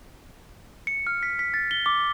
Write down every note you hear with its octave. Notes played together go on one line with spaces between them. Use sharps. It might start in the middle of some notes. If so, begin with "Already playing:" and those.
C#7
F6
B6
B6
A6
G7
D6